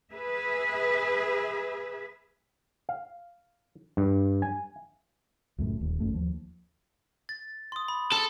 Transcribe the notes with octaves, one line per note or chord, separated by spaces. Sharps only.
G#4 B4 E5
F5
G2
G#5
C#2 F#2 A2
D#1 D#2
G1 F#2 A3
D#2 F3
A6
C6 D#6
B5
A4